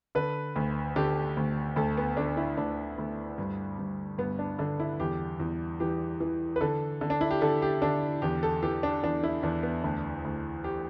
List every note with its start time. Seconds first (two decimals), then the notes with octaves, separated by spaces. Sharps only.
0.15 D3 B4
0.56 D2
0.96 D3 G4
1.37 D2
1.76 D2 A4
1.97 B3
2.17 D3 D4
2.37 E4
2.57 D2 D4
2.98 D2
3.38 G2
3.78 G2
4.18 G2 B3
4.39 D4
4.59 D3 D4
4.80 E4
5.00 E2 G4
5.40 E2
5.80 E3 G4
6.20 E3
6.56 B4
6.61 D3 A4
7.01 D3
7.10 D4
7.21 E4
7.31 G4
7.41 D3 A4
7.62 G4
7.82 D3 D4
8.22 E2 G4
8.43 A4
8.62 E3 G4
8.83 D4
9.03 E2 D4
9.23 E4
9.43 E2 D4
9.63 B3
9.83 D2 D4
10.25 D2
10.64 G4